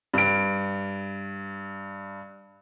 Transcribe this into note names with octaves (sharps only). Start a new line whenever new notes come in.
G2 D7